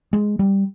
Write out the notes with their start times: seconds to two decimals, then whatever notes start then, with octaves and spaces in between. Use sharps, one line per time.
0.13 G#3
0.39 G3